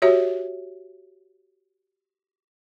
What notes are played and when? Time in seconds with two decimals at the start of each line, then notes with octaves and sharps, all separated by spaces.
0.02 F#4 G4 C#5 E5